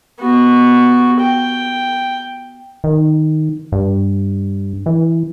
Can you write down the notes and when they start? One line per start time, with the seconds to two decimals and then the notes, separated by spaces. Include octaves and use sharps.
0.20 B3 F#4
1.20 G5
2.84 D#3
3.72 G2
4.86 E3